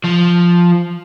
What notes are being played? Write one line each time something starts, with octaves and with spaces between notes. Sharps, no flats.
F3